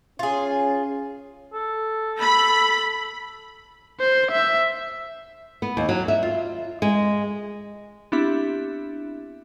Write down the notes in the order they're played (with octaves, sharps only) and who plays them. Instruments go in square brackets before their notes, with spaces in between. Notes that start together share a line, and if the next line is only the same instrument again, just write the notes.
[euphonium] C#4 [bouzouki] F4 G#4
[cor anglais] A4
[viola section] B5
[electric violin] C5
E5
[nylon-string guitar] B3
D#2
F#3
E5
F4
G#3
[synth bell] B3 C4 D4 E4 G4 E5